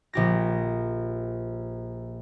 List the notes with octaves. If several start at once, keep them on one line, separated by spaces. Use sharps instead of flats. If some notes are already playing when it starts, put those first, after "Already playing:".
A#1 G4 A#6